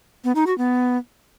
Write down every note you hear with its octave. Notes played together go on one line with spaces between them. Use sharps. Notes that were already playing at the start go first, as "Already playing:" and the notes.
B3
D#4
F#4
B3